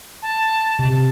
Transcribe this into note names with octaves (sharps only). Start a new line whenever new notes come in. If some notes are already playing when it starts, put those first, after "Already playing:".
A5
C3